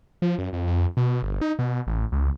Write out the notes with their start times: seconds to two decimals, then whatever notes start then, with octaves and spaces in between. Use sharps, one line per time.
0.22 F3
0.39 F#2
0.53 F2
0.67 F2
0.97 B2
1.23 G1
1.41 D#4
1.59 B2
1.87 A1
2.12 C#2